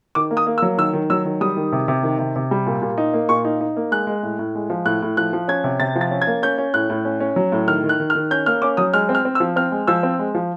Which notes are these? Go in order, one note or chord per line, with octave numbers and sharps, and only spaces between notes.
D#3 D6
A#3
D#6
A#3
E6
F#3
D#3 E6
D#3
F#3 E6
D#3
G3 D#6
D#3
C3
C3
D#3
C3
C3
G3
A#2
A#2
D#4
A#3
A#2 C#6
D#4
D#4
A#3
G#3 F#6
G#3
A2
A2
G#3
F3
A2 F#6
A2
F3 F#6
F3
C#4 G#6
C3
C3 A6
F3
A6
C#4
G#6
A#3
C#4 G6
C#4
A2 F#6
A2
C#4
C#4
F#3
A2
D#3 F6
D#3
F#6
D#3
F6
D#3
C#4 G6
A#3 F6
C#4 D6
F#3 D#6
G#3 F6
C4
F6
C4
E6
F3
C4 F6
G#3
F3 E6
C4
G#3
F3